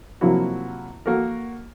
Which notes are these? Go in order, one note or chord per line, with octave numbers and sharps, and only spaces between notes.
C3 F3 F#3 A#3 E4 F#4
A#3 F#4 A4 A#4